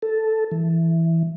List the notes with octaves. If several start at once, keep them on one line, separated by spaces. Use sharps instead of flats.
A4
E3